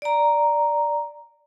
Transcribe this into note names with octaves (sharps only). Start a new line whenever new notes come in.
D5 A#5